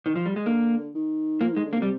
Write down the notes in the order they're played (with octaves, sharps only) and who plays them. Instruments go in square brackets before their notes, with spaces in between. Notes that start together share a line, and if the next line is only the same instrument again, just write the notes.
[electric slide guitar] D#3
F3
G3
G#3
[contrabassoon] D3 [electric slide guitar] A#3
[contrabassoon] D#3
[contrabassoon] F3 [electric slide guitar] A#3
[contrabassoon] D#3 [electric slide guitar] G#3
[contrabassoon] D3
[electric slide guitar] A#3
[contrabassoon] C3
[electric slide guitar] G3